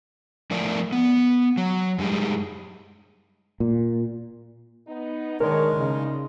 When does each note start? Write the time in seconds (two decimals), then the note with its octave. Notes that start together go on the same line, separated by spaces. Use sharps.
0.51 A2 F3 A3 A#4 D5
0.92 B3
1.57 F#3
1.98 F#2 G3 G#3
3.60 A#2
4.87 B3 D#4
5.40 A2 D#3 G#3 D4 G#4 A#4 C#5
5.75 A2 C#3 A#3 D#4